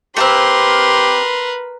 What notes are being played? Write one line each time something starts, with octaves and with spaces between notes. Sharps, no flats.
A3 A#3 C4 G4 A#4 B4 C6